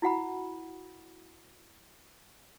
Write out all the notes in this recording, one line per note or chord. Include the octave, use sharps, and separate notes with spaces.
E4 F#4 F#5 B5